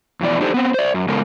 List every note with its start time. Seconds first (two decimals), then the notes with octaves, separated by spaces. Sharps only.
0.21 F2 B2 E3 D5
0.41 D4 D#4 G4 A4 C5
0.54 B3 C4
0.74 C5 D5
0.94 F#2
1.08 C#3 G#3 B3 A4 A#4